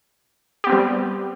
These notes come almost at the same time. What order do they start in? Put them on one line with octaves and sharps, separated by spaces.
G4 B3 C4 G3